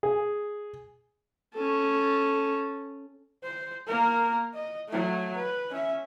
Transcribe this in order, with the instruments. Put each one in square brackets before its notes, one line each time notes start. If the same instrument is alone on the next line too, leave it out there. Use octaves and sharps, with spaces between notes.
[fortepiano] G#4
[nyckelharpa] C#4 A4
[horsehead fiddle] C5
A#3 A#4
D#5
F#3 A3
B4
C#4 E5